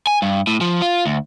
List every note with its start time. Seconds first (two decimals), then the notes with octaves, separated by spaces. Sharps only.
0.07 G#5
0.22 G2
0.47 A2
0.61 F3
0.82 F4
1.06 D2